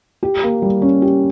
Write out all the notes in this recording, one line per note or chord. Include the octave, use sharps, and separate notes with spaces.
G4
A#3
G3
C#4
G4